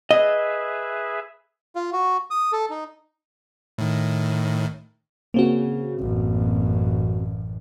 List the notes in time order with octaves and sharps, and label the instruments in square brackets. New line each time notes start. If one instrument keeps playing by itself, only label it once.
[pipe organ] G#4 B4 E5 [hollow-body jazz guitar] D#5
[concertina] F4
F#4
D#6
A4
D#4
[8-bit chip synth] A2 D#3
[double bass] C#3 [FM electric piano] A#3 C4 F#4
[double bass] A1 F#2